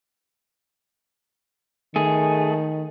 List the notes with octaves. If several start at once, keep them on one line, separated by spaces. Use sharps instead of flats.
D#3 A3 G#4